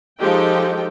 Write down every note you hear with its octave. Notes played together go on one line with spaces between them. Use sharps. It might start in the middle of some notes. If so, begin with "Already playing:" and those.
F3 G#3 D#4 G4 A4 G5